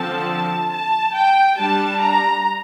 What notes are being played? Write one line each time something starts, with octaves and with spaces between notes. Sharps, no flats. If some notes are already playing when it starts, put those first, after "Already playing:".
Already playing: D3 F3 C4 A5
A5
G5
G3 D4 A5
A#5